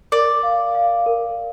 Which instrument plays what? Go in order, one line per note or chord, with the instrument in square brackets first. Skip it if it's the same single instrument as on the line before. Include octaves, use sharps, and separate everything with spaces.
[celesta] A#4 [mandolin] D5
[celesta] F5
F5
A#4